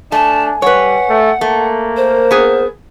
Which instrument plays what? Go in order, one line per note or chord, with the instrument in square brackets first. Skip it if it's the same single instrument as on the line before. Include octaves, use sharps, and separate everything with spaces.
[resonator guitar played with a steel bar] A3 [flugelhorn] D4 [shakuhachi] G#5 [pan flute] A5
[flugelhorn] G3 [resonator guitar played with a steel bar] B4 C#5 [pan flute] F#5
[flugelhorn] A3
[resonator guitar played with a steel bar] A3 [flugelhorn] A#3
[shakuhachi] A#4 [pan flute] C5
[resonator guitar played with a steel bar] B3 G#4